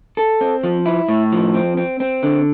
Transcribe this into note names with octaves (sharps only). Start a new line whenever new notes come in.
A4
C4
F3
E4
A2
F3
C4
C4
C4
D3